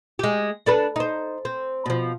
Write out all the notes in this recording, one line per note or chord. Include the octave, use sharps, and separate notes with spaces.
G#3 G4
D4 A4 B4
D#4 C5
C4
B2 F3